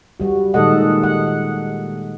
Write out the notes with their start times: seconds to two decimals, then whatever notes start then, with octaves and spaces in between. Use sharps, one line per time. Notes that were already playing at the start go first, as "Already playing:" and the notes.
0.20 G3 F#4
0.54 A#2 D#3 G#3 A4 D#5 F#5
1.03 F#5